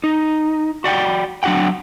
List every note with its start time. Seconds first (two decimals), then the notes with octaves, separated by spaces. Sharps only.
0.04 D#4
0.84 F#4 D5 F#5 G5
1.43 F#3 D4 F#4 F#5 G5